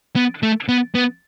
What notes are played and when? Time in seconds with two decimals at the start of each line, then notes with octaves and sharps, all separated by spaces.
0.16 B3
0.43 A3
0.69 B3
0.95 B3